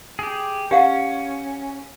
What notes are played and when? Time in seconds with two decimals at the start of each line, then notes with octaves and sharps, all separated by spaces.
0.19 G4 G#4
0.71 C#4 G4 F5 F#5